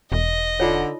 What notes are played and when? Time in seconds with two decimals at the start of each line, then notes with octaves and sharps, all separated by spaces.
0.12 E1 D#5
0.60 D3 D#4 F4 C#5